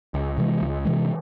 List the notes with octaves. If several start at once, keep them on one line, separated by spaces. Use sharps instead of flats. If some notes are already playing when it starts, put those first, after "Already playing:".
C#2
C3 E3 G#3
C#2
C3 E3 G#3